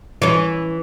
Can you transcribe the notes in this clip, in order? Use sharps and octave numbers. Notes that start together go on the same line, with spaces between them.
E3 C#4